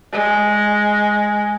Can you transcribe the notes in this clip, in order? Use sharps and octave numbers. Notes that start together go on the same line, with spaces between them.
G#3